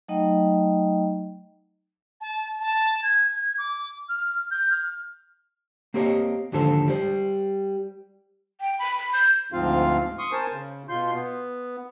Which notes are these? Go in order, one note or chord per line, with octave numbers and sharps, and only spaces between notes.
F#3 A3 D#4 D#5 G5 A#5
A5
A5
G#6
G#6
D6
F6
G6
F6
A#3 C4 G4 C#5 D#5
D#2 G#2 D3 F3 A4 C5
G3 C5
G5
B5
B5
G6
D2 G#2 F3 C4 F4 F5
C6 C#6 D#6
A#4 C5 G#5 A5
C#3
B2 F4 C6 G6
B3